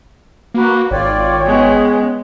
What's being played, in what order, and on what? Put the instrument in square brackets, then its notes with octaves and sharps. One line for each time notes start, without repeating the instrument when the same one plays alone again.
[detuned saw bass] A#3 [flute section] F#4 B4
[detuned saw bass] G#1 [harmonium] F4 D5 [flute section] C#5 G5
[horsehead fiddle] G#3 B3 [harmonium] C#4 G#4